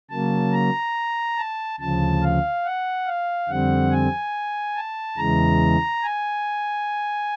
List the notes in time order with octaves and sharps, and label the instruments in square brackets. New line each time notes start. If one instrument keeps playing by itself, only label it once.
[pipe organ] C#3 F#3 A#3 A5
A#5
A5
D2 C#3 F3 A5
F5
F#5
F5
F2 D3 G3 C4 F#5
G#5
A5
E2 C#3 E3 G#3 A#5
G#5